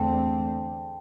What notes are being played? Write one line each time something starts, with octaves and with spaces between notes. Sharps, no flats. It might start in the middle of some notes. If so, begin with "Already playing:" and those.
Already playing: E2 D3 A3 C4 G5 A5